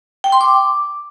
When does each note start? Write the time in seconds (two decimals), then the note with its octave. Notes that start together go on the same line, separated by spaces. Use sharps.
0.24 G5
0.32 C6
0.41 D6